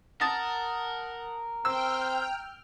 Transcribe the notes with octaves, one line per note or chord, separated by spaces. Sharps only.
A#4 F#5 A5 D#6 A6
C4 G5 E6 F6